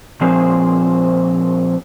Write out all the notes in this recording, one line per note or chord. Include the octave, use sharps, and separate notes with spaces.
A#2 F3 C4 G#4 C5